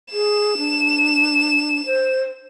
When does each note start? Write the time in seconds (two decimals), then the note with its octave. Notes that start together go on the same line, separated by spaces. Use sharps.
0.12 G#4 E7
0.58 D4
1.86 C5